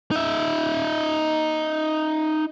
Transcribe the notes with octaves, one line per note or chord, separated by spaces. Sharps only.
D#4 E5